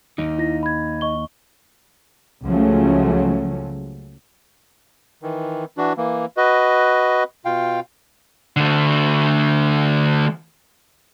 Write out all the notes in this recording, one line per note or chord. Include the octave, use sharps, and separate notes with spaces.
D#2 D#4
E4 A#6
B5 G#6
D#5 C#6 G7
C#2 C#3 F3 F#3 A3 C#4
D#3 E3
E3 D4 F#4
E3 A#3
F#4 B4 D#5
B2 F4 F5 G5
D3 A3